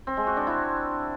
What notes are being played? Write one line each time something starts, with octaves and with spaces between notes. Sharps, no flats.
C4
G#3
F#4
D4
E4